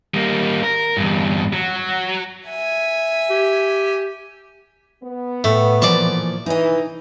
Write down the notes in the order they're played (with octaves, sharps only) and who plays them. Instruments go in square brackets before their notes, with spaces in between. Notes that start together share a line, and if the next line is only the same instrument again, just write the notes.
[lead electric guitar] G3 A#3
A#4
E2 G2
F#3
[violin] E5 G#5
[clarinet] G4
[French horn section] B3
[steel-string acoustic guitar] A2 [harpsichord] A3
[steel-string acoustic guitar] A#2 E3 F3 [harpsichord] D5 C#6
[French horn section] E3 [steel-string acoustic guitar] D#4 D#5